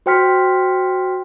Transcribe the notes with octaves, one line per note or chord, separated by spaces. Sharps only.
F#4 C5 G5 C6 F6 B6